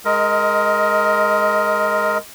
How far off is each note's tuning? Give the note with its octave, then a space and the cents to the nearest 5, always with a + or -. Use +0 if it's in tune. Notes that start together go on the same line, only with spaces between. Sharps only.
G#3 +0 A#4 +0 D#5 +25